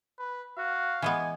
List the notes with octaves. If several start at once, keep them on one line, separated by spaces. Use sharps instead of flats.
B4
F#4 F5
E3 G#3 B3 G#5